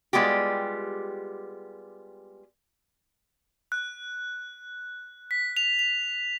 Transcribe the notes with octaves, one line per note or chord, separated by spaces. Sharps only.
G3 G#3 B3 F4 G4
F#6
B6
F7
F7